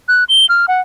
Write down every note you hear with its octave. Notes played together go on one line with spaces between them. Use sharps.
F#6
G7
F6
F#5